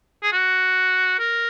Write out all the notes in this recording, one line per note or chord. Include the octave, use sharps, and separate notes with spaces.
G#4
F#4
A#4